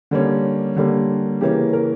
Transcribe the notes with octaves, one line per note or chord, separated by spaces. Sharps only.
D3 G3 A#3 C#4
D3 G3 A#3 C#4
C#3 E3 A#3 C#4 G4
A#4